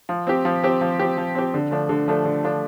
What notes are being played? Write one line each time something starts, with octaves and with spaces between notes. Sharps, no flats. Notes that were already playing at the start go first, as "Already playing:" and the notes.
F3
C4 G4
F3
C4 G4
F3
C4 G4
F3
C4 G4
D3
F3 A3 D4
D3
F3 A3 D4
D3
F3 A3 D4